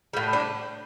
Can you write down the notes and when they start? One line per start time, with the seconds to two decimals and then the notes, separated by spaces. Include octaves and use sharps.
0.13 A2 G3
0.33 D4